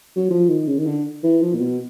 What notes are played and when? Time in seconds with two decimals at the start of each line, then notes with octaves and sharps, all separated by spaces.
0.16 F#3
0.30 F3
0.49 D#3
0.67 C#3
0.78 D#3
0.86 D3
1.23 E3
1.42 F3
1.54 A#2
1.61 B2